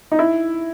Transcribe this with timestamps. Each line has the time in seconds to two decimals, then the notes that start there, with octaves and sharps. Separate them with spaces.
0.12 D#4
0.19 E4